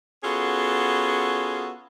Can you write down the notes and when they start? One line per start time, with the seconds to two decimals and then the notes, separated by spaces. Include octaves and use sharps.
0.24 B3 C#4 F4 F#4 G#4 A4